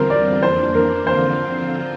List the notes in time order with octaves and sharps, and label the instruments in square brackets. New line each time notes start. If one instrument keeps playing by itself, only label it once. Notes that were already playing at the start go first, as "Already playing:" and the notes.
Already playing: [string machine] E2 D3 G3 C4 F4 [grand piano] A#4 C5
[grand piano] D5
[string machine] F2 E3 A#3 D4 [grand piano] C5
[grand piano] A#4
[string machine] D3 F3 C4 F4 [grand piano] C5